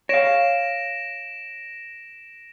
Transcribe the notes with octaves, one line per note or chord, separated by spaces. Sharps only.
C#5 F5 A#6 D7 E7